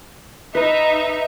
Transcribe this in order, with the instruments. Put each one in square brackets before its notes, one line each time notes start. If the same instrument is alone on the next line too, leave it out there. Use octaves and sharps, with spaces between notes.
[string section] D#4 E5 [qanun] B4